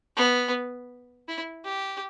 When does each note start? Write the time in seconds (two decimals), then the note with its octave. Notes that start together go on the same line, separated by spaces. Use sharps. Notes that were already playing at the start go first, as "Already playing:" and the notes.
0.16 B3
1.28 E4
1.65 G4